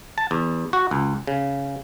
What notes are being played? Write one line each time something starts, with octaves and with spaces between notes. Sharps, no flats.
A5
E2
F#4
C#2
C#3